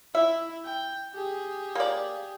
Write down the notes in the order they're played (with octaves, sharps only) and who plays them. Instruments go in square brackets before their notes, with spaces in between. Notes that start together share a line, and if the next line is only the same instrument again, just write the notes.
[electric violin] E4 [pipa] E5
[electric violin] G5
G4 G#4
[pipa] A#3 D5